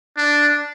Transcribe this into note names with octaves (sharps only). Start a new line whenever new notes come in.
D4